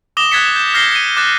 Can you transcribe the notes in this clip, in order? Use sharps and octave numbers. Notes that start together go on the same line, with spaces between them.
D6 D#6 A#6 E7 G7
F#6 G#6 A6 B6 C#7
G6 E7
F6 G6 A#6 C7 G7
C#7 D#7
D6 F#6 A6